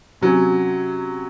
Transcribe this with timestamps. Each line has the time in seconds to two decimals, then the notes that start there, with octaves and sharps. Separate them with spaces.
0.21 C3 F#3 C#4